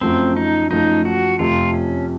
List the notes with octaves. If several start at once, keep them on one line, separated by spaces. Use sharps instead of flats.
F#2 F3 A3 C4
D#4
F#2 F3 A3 D#4
F#4
F2 C3 F3 A3 F4
C#4